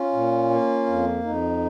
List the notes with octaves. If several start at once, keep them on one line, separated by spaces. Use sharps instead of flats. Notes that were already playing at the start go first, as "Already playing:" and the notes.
Already playing: C#4 F4
A#2
A#3
F2
F2 D#4